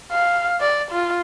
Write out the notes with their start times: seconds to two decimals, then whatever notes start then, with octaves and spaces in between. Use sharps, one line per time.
0.12 F5
0.60 D5
0.91 F4